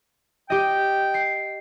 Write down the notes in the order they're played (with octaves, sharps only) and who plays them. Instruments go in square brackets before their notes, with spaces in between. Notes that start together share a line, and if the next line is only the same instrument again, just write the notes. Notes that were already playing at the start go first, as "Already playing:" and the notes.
[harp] G4 D#5 [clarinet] G5
[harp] C7